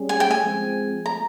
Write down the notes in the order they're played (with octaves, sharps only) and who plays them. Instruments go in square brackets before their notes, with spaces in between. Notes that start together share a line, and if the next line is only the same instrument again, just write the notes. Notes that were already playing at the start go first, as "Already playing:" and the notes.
Already playing: [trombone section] G3 C#4 G#4
[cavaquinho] G#5
G5
G#5
[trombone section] F3 G#3 C4
[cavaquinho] A#5